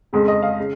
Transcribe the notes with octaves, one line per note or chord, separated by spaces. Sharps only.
F2 C#3 G#3
D#5
F5
C#3